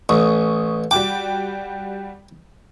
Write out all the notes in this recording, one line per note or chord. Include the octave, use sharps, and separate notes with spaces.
A1 C#6 D#6
G3 F#4 G5 D6